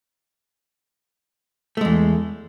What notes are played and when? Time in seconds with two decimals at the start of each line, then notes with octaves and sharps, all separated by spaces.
1.77 A3
1.81 G#3
1.85 E2